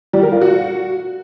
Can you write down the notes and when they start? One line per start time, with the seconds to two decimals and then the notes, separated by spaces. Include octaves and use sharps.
0.13 G3
0.23 A#4
0.32 F4
0.41 F#4